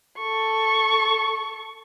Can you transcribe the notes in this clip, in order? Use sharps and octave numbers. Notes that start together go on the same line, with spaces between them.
A4 C#6